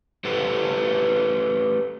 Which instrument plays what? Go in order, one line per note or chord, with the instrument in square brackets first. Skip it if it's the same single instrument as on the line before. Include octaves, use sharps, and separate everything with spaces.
[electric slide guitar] A3 G4 A4 B4 C5 F#5